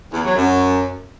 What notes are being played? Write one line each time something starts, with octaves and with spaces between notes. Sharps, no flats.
E2
F#3
F#2